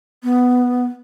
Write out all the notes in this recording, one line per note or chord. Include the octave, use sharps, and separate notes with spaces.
B3